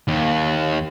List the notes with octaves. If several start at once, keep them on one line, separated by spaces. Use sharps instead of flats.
D#2